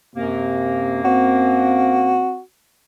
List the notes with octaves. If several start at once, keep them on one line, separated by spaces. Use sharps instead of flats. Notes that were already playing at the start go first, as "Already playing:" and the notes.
F#2 C3 A#3
C4 F#4